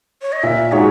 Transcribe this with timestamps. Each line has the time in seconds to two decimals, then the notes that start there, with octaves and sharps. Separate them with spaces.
0.22 C#5
0.32 D#5
0.43 A#2 E5
0.72 G#3 D#4 F#4 C#5